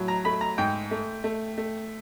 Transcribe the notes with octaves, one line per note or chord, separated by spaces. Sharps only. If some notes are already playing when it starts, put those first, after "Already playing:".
Already playing: A2 F#3
A#5
A3 B5
A#5
G#2 G5
A3
A3
A3